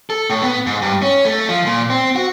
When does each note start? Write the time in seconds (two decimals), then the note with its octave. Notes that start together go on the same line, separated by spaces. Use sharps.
0.10 A4
0.30 A2
0.42 B3
0.67 G#2
0.82 G2
1.02 C#4
1.25 A3
1.49 F3
1.66 A#2
1.90 C4
2.16 F#4